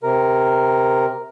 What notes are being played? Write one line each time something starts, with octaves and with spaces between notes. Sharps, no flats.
C3 A#4